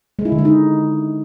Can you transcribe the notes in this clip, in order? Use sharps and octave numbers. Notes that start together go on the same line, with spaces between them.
G#3
E4
D3
G#3
D#4